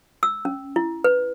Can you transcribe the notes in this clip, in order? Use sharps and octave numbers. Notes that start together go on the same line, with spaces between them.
E6
C#4
E4
B4